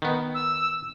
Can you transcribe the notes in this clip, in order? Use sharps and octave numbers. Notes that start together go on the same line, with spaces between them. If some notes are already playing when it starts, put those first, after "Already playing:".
D#3 B3
E6